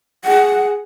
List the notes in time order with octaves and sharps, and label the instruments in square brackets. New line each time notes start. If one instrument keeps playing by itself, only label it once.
[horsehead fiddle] G#4 [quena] F#5